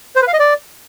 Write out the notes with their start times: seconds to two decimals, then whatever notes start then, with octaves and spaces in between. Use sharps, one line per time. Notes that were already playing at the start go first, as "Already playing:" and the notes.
0.16 C5
0.22 B4
0.28 F5
0.34 D#5
0.39 D5